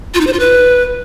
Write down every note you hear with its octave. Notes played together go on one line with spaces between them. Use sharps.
F4
D#4
C5
F4
B4